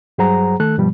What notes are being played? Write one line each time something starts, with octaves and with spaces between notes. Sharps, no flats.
G2 F#3 G#4 C5 F#5 A#5
D#3 A3 A4 F#6
G2 B2 F3 G3